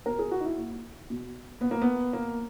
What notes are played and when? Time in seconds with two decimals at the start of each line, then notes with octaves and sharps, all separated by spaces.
0.06 B2 A#4
0.19 G#4
0.31 F#4
0.41 D#4
0.45 E4
0.57 A#2
1.10 B2
1.61 A#2 B3
1.71 A#3
1.82 B3
2.13 A#2 A#3